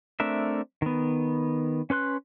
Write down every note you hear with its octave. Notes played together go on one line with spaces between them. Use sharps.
A3 C4 D4 A#4 E5
D#3 B3
C#4 B4 C6 F#6